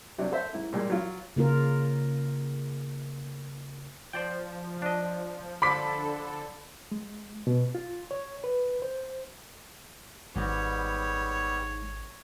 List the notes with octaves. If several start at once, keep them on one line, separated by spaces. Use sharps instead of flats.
C3 F#3 D4
A4 C5 E5
G#2 E4
A#2 G3 G#3
F#3 F4
C#3 A#3 F4 A#4
F3 C5 D5 G5
D4 D#5
D3 F3 A4 B5 D6 B6
G#3
B2
F4
C#5
B4
C5
G#1 G#2 G3 B3 G4 C#5